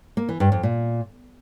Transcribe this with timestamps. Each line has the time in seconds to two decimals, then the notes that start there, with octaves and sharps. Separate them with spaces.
0.17 A#3
0.29 E3
0.40 G2
0.52 F2
0.63 A#2